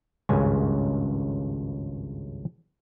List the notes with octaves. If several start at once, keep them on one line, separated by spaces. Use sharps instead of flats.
G#1 C#2 G2 C#3 G#5